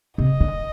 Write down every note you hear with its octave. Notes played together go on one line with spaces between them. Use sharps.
C3 D#5
D3